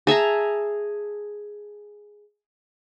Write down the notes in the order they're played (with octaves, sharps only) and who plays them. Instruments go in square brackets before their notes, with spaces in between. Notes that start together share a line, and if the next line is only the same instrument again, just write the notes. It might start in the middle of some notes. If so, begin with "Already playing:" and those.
[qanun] G#4 E5 A5 A#5